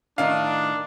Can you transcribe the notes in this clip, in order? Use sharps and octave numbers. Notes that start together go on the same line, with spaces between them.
A2 D#3 D4 D#4 F5